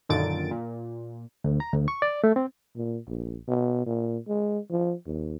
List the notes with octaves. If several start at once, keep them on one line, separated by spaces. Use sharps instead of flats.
F#2 A#2 D3 D#3 A6 D7
A#2
D2
A#5
D2
C#6
D5
A3
C4
A#2
A#1
B2
A#2
G#3
F3
D#2